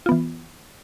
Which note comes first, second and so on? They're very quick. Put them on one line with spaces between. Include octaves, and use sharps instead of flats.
F4 B3 E3